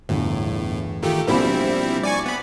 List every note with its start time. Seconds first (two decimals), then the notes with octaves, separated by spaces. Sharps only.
0.09 G1 E2 A2
1.03 D#3 A3 F4 G4
1.28 A#1 B2 G3 C4 E4 B5
2.03 D5 G#5 C#6
2.26 B3 B5